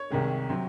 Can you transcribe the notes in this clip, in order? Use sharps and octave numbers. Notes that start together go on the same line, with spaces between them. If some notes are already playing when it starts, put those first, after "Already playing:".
Already playing: C#5
C2 C3 D#3 G#3
C3 F#3 C4